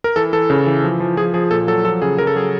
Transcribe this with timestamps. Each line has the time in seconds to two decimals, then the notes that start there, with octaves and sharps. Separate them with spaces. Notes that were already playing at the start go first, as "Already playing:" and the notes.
0.04 A#4
0.16 E3 A4
0.33 E3 A4
0.50 C#3
0.67 E3
0.84 F3
1.00 F3
1.17 F3 G#4
1.34 F3 G#4
1.51 A#2 A4
1.68 F#3 A4
1.84 F3 A4
2.02 C#3 G#4
2.18 C#3 A#4
2.27 A4
2.35 F#3 G#4